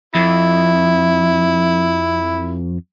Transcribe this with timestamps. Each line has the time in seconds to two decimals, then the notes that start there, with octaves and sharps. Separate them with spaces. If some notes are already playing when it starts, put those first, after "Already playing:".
0.15 F2 E4